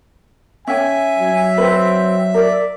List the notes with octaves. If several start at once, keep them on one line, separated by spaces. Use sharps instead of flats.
C#4 E5 G5 G#5
F#3
C4 B4
A#4 D5